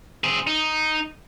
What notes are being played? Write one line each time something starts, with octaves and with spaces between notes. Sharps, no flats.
C4 G#4
D#4